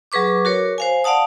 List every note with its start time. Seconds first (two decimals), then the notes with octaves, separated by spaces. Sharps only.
0.12 F#3 G#4 B4 C#6 D6
0.45 F#4 A#4 C#5
0.78 C5 F5 G#5
1.04 D5 F5 F#5 A5 D#6